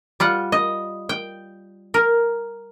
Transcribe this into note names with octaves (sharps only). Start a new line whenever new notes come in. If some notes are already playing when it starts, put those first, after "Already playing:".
G3 F4 F#5
D#5
G5
A#4